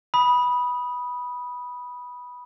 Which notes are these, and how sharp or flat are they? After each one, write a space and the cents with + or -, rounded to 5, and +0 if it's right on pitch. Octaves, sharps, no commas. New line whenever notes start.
B5 -10 D#6 +0